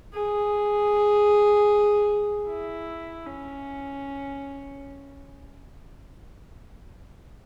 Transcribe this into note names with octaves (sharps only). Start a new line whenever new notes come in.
G#4
E4
C#4